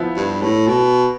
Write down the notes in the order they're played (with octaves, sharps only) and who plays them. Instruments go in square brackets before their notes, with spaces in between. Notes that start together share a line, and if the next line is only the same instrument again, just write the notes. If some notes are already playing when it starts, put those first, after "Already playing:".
Already playing: [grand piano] F3 B3 E4
[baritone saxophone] G2
A2
B2